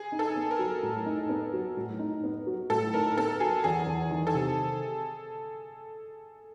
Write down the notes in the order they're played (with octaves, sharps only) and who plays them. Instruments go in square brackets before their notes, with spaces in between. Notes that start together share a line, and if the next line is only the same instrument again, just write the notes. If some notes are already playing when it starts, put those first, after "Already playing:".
Already playing: [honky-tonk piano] G#4
[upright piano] D#4
[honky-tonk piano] A4
[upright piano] B3
[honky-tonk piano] A#4
[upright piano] F#3
A2
D#4
B3
F#3
A2
D#4
B3
F#3
[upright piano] A2 [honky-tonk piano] A4
[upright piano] D#4 [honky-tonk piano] A#4
[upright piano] B3 [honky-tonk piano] A4
[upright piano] F#3 [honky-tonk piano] G#4
[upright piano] E2 [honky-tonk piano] G#4
[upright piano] E2
D#3
[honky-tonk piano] A4
[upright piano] C3